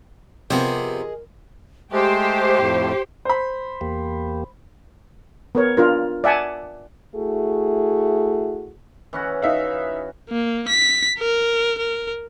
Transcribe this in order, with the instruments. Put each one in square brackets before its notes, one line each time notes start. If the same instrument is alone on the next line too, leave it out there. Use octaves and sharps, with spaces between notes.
[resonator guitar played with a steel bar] C3 B3 [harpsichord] F3 G4 [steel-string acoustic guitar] G#4 D#5 [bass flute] A#4
[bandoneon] G#3 A3 [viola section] G4 [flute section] C5
[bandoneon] F2 A2
[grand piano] C5 B5
[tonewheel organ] E2 A#3 G4
[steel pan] B3 A#4 C#5
D4 F4 A#4
D5 E5 F#5 G#5 A5
[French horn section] A3 E4 F#4 G#4
[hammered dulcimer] E3 C#4 F#4
[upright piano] D#4 E5 F5
[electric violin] A#3
B6
A#4
A#4